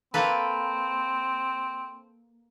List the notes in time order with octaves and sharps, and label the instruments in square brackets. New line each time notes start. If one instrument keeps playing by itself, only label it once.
[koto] A#3 A4 B4 [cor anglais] C4